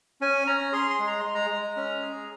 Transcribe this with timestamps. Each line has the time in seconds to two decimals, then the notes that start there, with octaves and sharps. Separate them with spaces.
0.21 C#4 G#5
0.47 C#4 A#5
0.73 G#4 C6
0.90 C6
0.99 G#3
1.07 A#5
1.20 G#3 C6
1.35 A#5
1.50 G#3
1.76 C#4
2.02 G#4